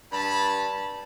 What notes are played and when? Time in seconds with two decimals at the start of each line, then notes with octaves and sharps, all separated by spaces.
0.12 G2 A5 B5